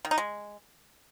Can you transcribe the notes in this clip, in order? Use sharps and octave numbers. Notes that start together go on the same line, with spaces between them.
D#3
D#4
G#3